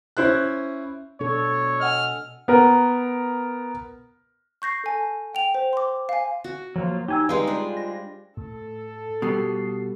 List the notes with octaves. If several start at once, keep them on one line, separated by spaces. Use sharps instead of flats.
C#4 E4 C5 F#6
B2 D4 A4 C#5
D#5 F#5 G#5 F6
B3 A#4
C#6 G6 A#6 C7
A4 G#5 A5
F#5 G5 F7
C5
C6 D6
F5 G#5
F#4
F3 F#3 A#3 F4
D#4 G4 G#5 E6
G3 G#3 D#4 B4 F5 C6
G#3 D4 F4 C5
A#6
A2 A4
B2 G3 D#6 C7